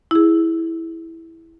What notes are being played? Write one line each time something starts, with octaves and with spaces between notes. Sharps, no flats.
E4 G#4